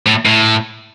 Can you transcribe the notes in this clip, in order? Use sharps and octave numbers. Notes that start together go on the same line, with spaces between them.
A2
A2